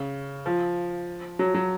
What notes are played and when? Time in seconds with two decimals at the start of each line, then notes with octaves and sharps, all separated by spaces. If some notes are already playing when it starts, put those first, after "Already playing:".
Already playing: C#3
0.46 F3
1.39 F#3
1.54 F#3